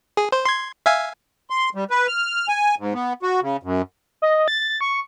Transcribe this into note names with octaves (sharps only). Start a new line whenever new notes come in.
G#4
C5
C6 G#6
E5 F5 G#5
C6
G3
B4
F6
G#5
G#2
B3
F#4
C#3
F#2
D#5
A6
C#6